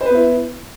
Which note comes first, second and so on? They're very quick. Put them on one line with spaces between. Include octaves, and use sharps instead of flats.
C5 B4 B3 E4